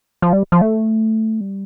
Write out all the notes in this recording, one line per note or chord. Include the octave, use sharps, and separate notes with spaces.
F3
G3
F3
A3
G3